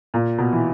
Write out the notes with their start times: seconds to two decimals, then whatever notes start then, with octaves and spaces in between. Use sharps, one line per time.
0.14 A#2
0.38 B2
0.53 E3